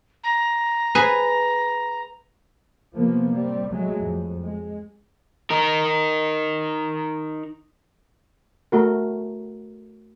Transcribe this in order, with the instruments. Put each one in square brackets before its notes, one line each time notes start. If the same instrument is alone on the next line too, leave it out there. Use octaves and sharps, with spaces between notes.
[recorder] A#5
[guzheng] G#4 B4 G#5
[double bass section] C3 F3 A#3 B3
G3 C4
F#3 G#3 A3
F2
G#3
[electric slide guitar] D#4 A#4
[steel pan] A3 F#4 A#4